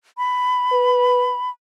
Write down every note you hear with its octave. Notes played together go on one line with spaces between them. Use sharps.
B5
B4